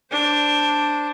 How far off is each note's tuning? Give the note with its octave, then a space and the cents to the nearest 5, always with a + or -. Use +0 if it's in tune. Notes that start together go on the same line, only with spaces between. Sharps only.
D4 +0 C5 +0